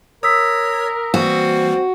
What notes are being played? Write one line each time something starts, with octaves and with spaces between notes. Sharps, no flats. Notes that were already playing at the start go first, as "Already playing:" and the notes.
A#4 C#5 D#6 E6 B6
E3 G3 A#3 C4 F#4